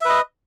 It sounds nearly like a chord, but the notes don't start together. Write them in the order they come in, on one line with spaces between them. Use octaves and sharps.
E5 B4 D#5